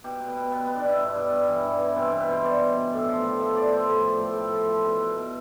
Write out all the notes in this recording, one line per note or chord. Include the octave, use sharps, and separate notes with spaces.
B2 G4
B2
B3
B2
B2 B3
B2 B3
D4
B2 E4
G2 B3
G2
G2
E3
G2
E3
B2 C4
B2 G4
B4
B2 C5
B2 D5
B2
B2
A2
F3
A2
F3 E5
F3 D5
A2 C5
A2
F3
A2
A2
F3
F3
B2 A4
B2
B2